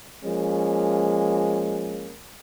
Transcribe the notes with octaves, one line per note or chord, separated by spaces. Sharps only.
F3 G#3 A#3 C#4